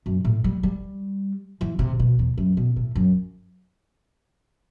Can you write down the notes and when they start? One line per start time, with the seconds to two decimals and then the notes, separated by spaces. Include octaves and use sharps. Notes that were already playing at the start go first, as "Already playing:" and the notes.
0.06 F#2
0.24 A2
0.44 G3
0.63 G3
1.61 E3
1.79 C3
1.99 B2
2.19 E2
2.38 F#2
2.57 B2
2.76 A2
2.95 F#2